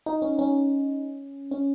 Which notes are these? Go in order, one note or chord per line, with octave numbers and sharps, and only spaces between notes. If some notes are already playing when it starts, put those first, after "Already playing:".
D#4
C#4
C#4
C#4